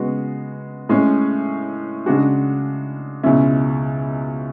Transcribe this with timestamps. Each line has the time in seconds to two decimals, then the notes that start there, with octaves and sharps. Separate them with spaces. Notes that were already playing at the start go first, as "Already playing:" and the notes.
Already playing: C#3 G#3 B3 F#4
0.89 A2 G#3 C#4
2.06 C#3 G#3 D4 F#4
3.23 C#2 B2 G#3 C#4 E4